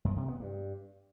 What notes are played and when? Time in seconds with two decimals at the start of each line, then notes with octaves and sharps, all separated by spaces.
0.05 F#2
0.16 C3
0.28 B3
0.40 G2